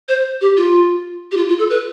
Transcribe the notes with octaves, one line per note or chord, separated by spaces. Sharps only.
C5
G4
F4
G4
F4
F4
A4
B4